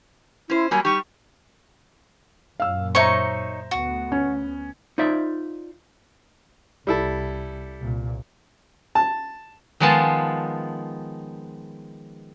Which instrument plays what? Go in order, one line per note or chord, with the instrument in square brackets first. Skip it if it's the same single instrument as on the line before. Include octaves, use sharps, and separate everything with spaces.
[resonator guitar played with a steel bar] C#4 C5 [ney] E4
[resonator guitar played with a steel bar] F#3 G3 A#3 [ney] G#5
[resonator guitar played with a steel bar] G3 D#4 G4 [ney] C#6
[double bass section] F#2 A#2 [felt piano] F5 E6
[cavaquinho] D#4 C#5 C#6 [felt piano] C5 E5 A#5
[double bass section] D2 B3 [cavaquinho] F#4
[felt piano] C#4
[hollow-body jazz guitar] D#4 F4 C5 D5 E5
[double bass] C2 [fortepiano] G3 E4 A4
[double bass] C2 A#2
[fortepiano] A5
[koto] D#3 F3 G#3 B3 F4 A5